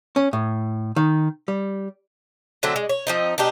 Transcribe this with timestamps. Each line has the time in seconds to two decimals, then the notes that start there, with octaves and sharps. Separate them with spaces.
0.16 C#4
0.33 A2
0.96 D#3
1.48 G3
2.63 D3 F#3 A3 C4
2.76 G#3
2.89 C#5
3.07 F3 C4 D#4
3.38 B2 D4 D#4 G4